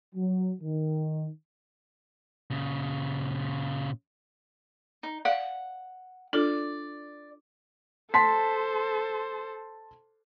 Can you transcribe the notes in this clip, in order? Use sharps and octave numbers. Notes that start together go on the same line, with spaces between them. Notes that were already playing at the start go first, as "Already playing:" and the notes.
F#3
D#3
A#2 C#3
D#4
D5 F5 F#5
D4 F4 A4 D5
A4 C5 A5 C6 B6